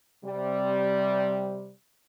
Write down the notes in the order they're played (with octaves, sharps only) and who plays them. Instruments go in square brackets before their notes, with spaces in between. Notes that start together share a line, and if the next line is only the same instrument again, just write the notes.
[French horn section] C3 G3